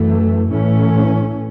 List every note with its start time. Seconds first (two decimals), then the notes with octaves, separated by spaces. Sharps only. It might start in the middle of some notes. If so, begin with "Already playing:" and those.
Already playing: F#2 E3 A3
0.49 A2 E3 A3 C#4